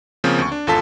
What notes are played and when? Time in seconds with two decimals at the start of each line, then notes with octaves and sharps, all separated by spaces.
0.24 C#3 F3 A#3 C4 C#4
0.39 D2 C#6
0.52 D4
0.67 G#1 E2 F4 A4 A5 B6